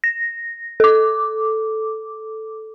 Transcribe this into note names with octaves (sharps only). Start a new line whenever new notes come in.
A#6
A4 D6